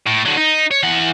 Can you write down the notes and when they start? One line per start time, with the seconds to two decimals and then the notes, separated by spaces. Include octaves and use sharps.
0.06 A2
0.26 D3 F#3
0.37 D#4
0.71 C#5
0.83 E3 F#5